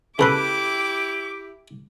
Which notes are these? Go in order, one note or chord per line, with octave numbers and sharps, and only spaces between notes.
C#3 E4 G4 A4 B4 B5 C6 D6